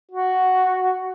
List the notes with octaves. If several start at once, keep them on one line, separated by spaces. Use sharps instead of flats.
F#4